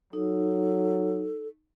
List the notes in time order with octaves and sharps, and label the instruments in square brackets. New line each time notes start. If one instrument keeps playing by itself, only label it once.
[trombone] F#3 [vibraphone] D#4 [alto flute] A4